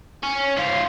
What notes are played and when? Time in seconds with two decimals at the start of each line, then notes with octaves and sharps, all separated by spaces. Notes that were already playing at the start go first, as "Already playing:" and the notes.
0.23 C#4
0.57 G#2 F4